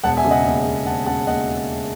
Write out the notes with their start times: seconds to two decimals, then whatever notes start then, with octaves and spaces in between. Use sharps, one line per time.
0.04 E1 F#5 A5
0.17 E5 G#5
0.24 C#3
0.31 D#5 F#5
0.44 D#2
0.65 E1
0.86 E1 F#5 A5
1.06 C#3 F#5 A5
1.27 D#2 D#5 F#5